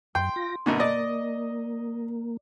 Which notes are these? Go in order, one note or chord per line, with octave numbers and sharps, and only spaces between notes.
F#2 G5 C6
F4 A#6
F#2 B2 D3 A#3
D5 D#5